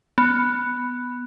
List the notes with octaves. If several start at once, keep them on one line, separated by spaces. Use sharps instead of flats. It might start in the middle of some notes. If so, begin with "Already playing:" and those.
B3